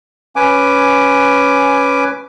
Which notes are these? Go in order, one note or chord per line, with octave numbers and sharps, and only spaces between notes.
C#4 B4 G#5 D6